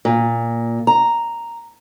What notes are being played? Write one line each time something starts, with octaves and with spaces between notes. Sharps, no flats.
A#2
A#5